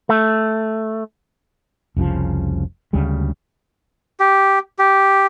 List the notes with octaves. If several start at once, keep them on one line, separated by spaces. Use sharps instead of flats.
A3
F1 C2 C#3 F3
D2 C#3 G3 G#3
G4
G4